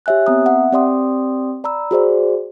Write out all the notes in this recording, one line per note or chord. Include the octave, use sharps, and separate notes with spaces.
G4 C#5 E5 G#5 F#6
B3 C4 A#5 D#6
E5 F#5
C4 G4 D5 G5 C6 D#6
D5 A#5 B5 E6
F#4 G#4 C5 D5